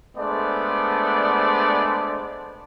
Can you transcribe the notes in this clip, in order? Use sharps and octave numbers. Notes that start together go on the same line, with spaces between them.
G#3 A3 B3 D4 C5 D5